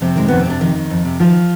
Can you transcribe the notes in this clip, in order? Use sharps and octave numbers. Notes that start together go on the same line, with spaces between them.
F2 C3 C4
D#3 G#3
F2 B3
C4
C3 D4
F2 D#3 D#4
D#3
F2
C3
D#3 F3 F4